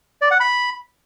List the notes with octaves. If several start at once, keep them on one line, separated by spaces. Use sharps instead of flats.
D5
F#5
B5